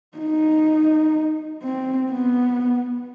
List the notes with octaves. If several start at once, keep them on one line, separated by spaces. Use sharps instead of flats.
D#4
C4
B3